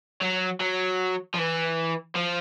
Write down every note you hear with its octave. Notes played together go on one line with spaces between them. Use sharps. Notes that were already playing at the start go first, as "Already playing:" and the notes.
F#3
F#3
F3
E3
F3